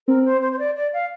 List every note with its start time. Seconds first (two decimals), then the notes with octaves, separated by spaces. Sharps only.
0.07 C4 A#4
0.25 C5
0.41 C5
0.52 C5
0.59 D5
0.76 D5
0.93 F5